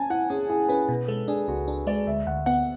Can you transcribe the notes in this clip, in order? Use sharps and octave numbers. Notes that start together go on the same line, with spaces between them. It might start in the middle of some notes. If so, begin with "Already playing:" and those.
Already playing: C#4 G#5 A5
E4 F#5
C#4 G#4
E4 G#4
C#4 B4
B2 B4
G#3 A4
D4 G#4
C#2 F#4
D4
G#3 D5
D2 E5
D2 F#5
B3 F#5